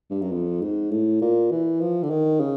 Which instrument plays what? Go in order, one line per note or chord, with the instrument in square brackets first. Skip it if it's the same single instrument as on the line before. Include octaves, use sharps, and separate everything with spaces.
[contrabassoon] G2
F#2
F2
G#2
A2
A#2
E3
F3
D3
D#3
C#3